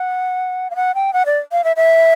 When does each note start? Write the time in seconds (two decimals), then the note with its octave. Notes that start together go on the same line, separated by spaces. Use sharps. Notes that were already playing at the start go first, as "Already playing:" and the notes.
Already playing: F#5
0.70 F5
0.76 F#5
0.95 G5
1.13 F#5
1.26 D5
1.52 F5
1.64 E5
1.76 E5